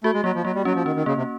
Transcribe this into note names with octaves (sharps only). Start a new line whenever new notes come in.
A3 F#4
G#3
F#3 A#3
F3
F#3 A#3
G3
F#3 C#4
F3
D#3 C#4
D#3
C#3 A#3
C3